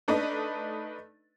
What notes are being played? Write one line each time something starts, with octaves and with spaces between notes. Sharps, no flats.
A3 D4 D#4 B4 D5 D#5